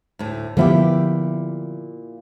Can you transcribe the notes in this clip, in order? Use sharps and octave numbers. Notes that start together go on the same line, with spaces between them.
D2 A2
A#2 D3 F3 B3 E4 G4